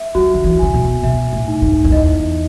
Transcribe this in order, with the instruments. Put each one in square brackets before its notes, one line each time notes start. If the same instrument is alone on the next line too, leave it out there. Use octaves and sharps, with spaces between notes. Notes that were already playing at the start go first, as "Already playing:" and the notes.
Already playing: [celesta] E5
[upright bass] F#3 [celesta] F#4
[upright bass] D#3
E3
[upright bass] C#3 [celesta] G#5
[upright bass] B2
[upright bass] B2 [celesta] E5
[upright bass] A2
[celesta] D#4
[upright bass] G#2
F#2
[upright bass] E2 [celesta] D#5